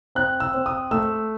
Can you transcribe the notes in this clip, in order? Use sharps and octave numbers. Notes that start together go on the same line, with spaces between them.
C4 F#6
E6
C4
D#6
A3 E6